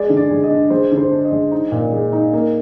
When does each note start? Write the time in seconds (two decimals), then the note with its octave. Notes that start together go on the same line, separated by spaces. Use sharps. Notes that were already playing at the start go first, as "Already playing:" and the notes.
Already playing: G#3 D5
0.09 D3
0.17 D5
0.31 G#3
0.44 D#5
0.51 D4
0.70 G#3 C5
0.92 D3
0.98 C5
1.11 D4
1.25 D#5
1.32 G#3
1.52 D#4
1.72 A#2
1.93 G#3
2.13 D#4
2.33 A#3